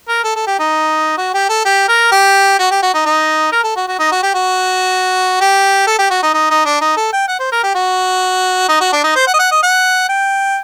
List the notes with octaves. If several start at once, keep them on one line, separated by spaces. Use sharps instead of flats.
A#4
A4
A4
G4
D#4
F#4
G4
A4
G4
A#4
G4
F#4
G4
F#4
D#4
D#4
A#4
A4
F#4
F#4
D#4
F#4
G4
F#4
G4
A4
G4
F#4
D#4
D#4
D#4
D4
D#4
A4
G5
F#5
C5
A#4
G4
F#4
D#4
F#4
D4
D#4
C5
F#5
D#5
F#5
D#5
F#5
G5